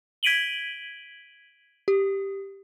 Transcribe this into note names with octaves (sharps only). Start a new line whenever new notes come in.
G#6 B6 D7 D#7 F#7 G7
G4